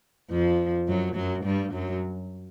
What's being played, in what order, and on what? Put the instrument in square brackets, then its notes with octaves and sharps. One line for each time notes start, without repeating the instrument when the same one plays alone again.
[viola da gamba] F2 F3
F#2 F#3
F#2 F#3
G2 G3
F#2 F#3